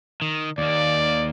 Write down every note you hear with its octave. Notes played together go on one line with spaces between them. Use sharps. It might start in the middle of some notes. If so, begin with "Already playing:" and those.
D#3
D#2 A#3 D5